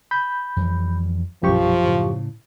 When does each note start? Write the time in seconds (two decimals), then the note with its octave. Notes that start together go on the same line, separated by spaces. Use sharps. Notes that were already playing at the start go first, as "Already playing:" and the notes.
0.11 B5 G6
0.56 F2 E3 G3
1.43 A#1 F#2 B2 F3 G3 G4 C#6
1.84 A2 C#3